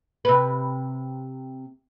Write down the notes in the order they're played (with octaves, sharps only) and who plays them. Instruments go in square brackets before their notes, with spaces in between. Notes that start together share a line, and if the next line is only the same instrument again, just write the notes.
[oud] C3 B4